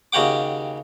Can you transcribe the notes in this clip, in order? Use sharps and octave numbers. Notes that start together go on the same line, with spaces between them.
D#2 C#3 F#4 G4 F#5 D6